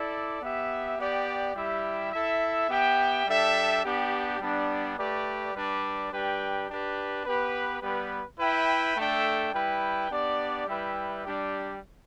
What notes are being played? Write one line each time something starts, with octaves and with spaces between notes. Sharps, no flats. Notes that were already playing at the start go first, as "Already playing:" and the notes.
Already playing: E4 A4 D5
B3 G4 E5
B3 G4 D5 G5
G3 E4 G4 E5
E4 A4 E5
B3 G4 E5 G5
G3 D4 A4 E5 G5
B3 D4 G4
G3 B3 D4
A3 G4 B4 D5
G3 D4 B4 D5
G3 D4 G4 B4 G5
D4 G4 B4
B3 G4 B4
G3 B3 G4 B4
E4 B4 E5 G5
A3 D4 A4 E5 G5
G3 E4 B4 G5
B3 D4 G4 D5
G3 E4 B4 E5 G5
G3 D4 G4